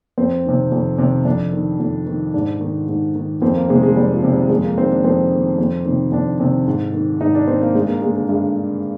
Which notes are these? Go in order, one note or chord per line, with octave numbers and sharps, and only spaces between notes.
F2 C4
C3 D#3
F2
C3 D#3
F2 D4
D#3
F2
D#3
G#2 D4
D#3
G#2
D#3
F2 C4
A#3
C3 D#3 G#3
G#3
F2 G3
F3
C3 D#3
G3
F2 G#3
A#3
D#3 C4
D4
F2 C4
D#3
F2
C3 D#3
F2 D4
C3 D#3
G#2
D#3
G#2 D#4
D4
D#3 C4
A#3
G2 G#3
A#3
D3 G#3
A#3
G2 G#3
D3